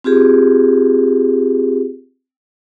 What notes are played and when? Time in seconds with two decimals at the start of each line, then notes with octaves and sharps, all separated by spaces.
0.04 C4 F4 G4 G#4